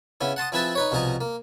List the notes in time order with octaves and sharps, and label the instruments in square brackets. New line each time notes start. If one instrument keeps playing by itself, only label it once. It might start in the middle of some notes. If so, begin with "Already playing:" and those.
[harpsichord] C#3 B3 E4
F#5 A5 C6 D#6
F3 C4 E4 G#4 B4 A5
D#4 B4 C#5
C2 B2 F3 G#4 D#5 A#5
A#3